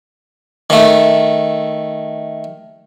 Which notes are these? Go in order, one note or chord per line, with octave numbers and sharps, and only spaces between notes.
D#3 A3